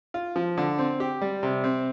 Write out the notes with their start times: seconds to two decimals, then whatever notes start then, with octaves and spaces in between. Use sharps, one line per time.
0.14 F4
0.36 F3
0.58 D3
0.79 C4
1.00 G4
1.21 G3
1.43 C3
1.64 C4